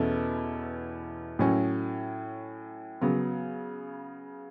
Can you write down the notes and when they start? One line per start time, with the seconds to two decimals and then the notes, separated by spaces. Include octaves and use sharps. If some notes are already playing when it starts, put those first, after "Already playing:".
Already playing: E2 B2 A3 C#4 E4
1.39 A2 F#3 C#4
3.01 C#3 F#3 B3